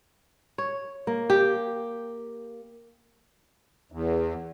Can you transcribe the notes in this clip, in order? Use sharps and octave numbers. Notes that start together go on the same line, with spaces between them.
C#5
A#3
G4
E2